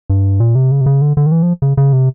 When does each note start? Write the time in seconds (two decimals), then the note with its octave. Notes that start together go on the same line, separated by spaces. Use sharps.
0.10 G2
0.40 A#2
0.55 C3
0.71 C#3
0.81 C3
0.86 C#3
1.01 D3
1.17 D3
1.26 D#3
1.32 E3
1.42 F3
1.62 C#3
1.77 C#3
1.93 C3